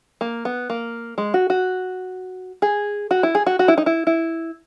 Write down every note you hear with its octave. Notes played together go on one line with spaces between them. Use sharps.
A#3
B3
A#3
G#3
F#4
F#4
G#4
F#4
E4
G#4
F#4
F#4
E4
D#4
E4
E4